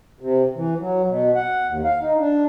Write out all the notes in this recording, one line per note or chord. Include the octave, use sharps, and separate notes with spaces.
C3
E3
F#3
B2
F#5
D#2
F5
D#4
D4